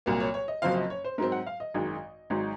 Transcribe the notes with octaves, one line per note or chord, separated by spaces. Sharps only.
C2 A#2 F#3 A#3
C#5
C#5
D#5
F#1 F#2 F3 C4 F5
D#5
C#5
C5
G#2 F#3 C4 A#4
F#5
F5
D#5
G#1 F#2 D#3 G#3
G#1 G#2 F#3